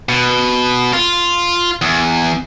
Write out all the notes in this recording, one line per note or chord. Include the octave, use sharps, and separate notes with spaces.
B2
F4
E2